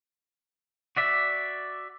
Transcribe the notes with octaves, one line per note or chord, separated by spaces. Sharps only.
F#4 D5 E5